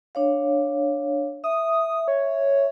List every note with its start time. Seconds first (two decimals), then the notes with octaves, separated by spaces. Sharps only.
0.15 D4 C#5 F5
1.44 E5 D#6
2.08 C#5